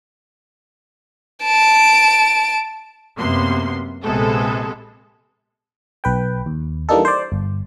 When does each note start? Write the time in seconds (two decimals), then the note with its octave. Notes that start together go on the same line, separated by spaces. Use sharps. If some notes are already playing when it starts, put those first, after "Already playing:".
1.44 A5 D7
3.16 F#2 C3 A#3 B3 C6
4.04 A#1 C3 G#3 B3 A4
6.04 B1 B4 G5
6.46 D#2
6.89 E3 G3 A#3 D4 D#4 A4
7.05 C5 D5
7.32 G1